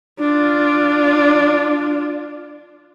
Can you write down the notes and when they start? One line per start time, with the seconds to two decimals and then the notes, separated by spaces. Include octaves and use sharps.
0.19 D4 F4